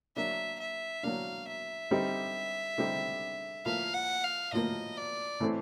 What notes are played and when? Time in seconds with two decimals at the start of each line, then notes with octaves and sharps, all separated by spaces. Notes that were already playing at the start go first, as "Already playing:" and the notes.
0.16 F#3 A#3 D4 E5
0.60 E5
1.03 F#3 A#3 D4 F5
1.47 E5
1.91 D3 G3 C4 D#4 G4
2.78 D3 G3 C4 D#4 G4
3.65 A2 F3 A#3 F5
3.94 F#5
4.24 F5
4.52 A2 F3 A#3 D#5
4.97 D5
5.40 A2 E3 A3 C4